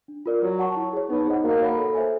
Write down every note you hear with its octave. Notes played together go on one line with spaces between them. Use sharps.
D4
F4 A#4 D5
F#3 C#5
F#5 A5 C#6
E4
G#4 C#5
B3 D#4
G#4 C5 D#5 F#5
A#3 F#4
A#4 C#5 F#5 B5
A4
C5 E5 G#5